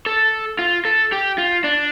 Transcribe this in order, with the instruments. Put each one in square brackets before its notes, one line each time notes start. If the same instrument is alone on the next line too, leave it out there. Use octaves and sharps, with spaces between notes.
[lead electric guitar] A4
F4
A4
G4
F4
D4